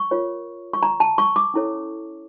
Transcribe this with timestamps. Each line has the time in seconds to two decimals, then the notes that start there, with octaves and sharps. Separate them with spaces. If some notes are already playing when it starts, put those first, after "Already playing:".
Already playing: C#6
0.11 F4 A#4 C#5
0.73 C#6
0.83 A#5
1.00 A5
1.18 C#6
1.36 D6
1.54 C#4 E4 A4 C#5